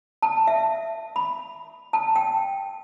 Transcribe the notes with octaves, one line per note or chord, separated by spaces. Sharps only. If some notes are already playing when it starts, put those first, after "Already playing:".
A5
E5
B5
A5
G5